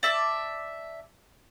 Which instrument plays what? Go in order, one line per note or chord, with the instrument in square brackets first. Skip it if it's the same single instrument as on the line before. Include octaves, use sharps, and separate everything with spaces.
[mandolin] D5 E5 A5 D6